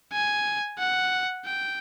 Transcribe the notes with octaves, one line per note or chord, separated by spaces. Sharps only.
G#5
F#5
G5